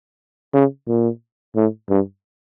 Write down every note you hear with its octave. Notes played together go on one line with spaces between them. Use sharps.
C#3
A#2
A2
G2